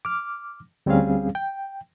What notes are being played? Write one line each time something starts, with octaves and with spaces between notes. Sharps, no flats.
D6 F6
D2 G3 C4 C#4 G#4 F5
G5